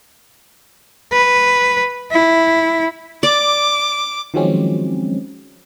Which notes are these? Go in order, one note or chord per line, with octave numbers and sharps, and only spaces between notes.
B4
E4
D5 D6
D#3 F3 F#3 G#3 C4 C#4